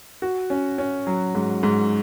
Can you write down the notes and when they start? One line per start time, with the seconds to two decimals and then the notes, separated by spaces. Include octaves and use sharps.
0.22 F#4
0.50 C#4
0.78 C#4
1.07 F#3
1.35 G#2
1.63 G#2